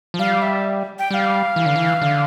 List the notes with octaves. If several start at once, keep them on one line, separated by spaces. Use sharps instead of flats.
F3
G3 F5
E5
G5
G3 F5 G5
E3
D3
E3
D3